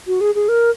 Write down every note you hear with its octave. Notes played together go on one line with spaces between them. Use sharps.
F#4
G#4
G#4
A#4